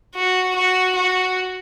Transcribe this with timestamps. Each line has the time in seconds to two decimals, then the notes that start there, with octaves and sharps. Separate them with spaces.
0.16 F#4
0.56 F#4
0.96 F#4